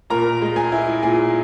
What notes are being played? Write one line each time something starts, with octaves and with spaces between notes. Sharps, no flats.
A#2 A#4 A#5
G#3
G#4 G#5
E4
A#2 G#4 G#5